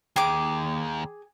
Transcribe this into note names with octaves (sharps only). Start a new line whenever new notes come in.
D#2 G#4 G5 D6